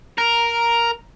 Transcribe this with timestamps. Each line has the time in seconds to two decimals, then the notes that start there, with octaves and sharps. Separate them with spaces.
0.18 A#4